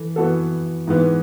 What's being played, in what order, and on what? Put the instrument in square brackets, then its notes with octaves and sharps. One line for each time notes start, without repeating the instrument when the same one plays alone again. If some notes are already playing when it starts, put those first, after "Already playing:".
Already playing: [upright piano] E3 A4
E3 B3 F#4 A4
G#2 E3 B3